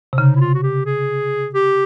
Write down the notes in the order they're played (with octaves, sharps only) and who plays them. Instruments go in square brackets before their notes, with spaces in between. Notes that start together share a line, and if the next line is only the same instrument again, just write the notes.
[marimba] C3
[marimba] C#3 [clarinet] D#4
[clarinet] E4
F4
F#4
G4
G#4
G4